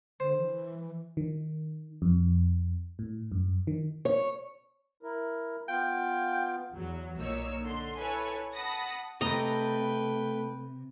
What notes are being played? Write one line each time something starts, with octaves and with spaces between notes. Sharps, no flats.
D3 C5
E3
D#3
F2
A2
F#2
D#3
C#5
E4 A#4
B3 F4 F5 G5
E2 F#3
B1 A#2 A#3 D#4 C#5 E6
D3 C6
E4 A4 B4 C#5 G#5
F#5 A5 B5 D#6 A#6
C3 A3 A4 B4 D#5 G5 A#5